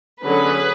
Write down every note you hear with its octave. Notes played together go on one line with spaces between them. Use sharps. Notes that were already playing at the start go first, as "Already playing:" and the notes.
D3 F#3 C#4 G#4 B4